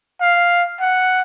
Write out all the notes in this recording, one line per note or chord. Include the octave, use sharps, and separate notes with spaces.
F5
F#5